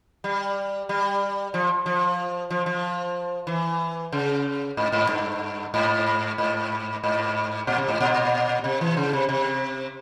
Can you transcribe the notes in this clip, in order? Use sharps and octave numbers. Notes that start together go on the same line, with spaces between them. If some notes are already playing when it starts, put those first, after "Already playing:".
G3
G3
F3
F3
F3
F3
E3
C#3
G#2
G#2
G2
G#2
G#2
G#2
A#2
C3
G#2
A#2
C3
E3
C#3
C3
C3